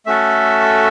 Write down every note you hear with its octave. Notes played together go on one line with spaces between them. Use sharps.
A3 C#4 F#4 A4 E5